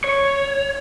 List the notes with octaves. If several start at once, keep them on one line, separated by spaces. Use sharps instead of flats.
C#5